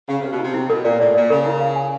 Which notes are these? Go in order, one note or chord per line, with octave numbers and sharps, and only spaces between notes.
C#3 F5
C3 B4
B2
C3 E4
E4
B2 A#4
A#2 D5
A2 D5
A#2 D5
C#3 A#4
E4
F5
G#5